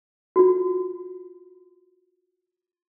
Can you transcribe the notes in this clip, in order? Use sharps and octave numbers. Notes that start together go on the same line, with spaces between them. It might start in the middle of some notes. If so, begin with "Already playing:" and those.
F4 F#4